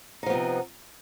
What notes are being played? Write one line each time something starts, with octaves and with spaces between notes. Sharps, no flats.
C3 F3 B3 D#4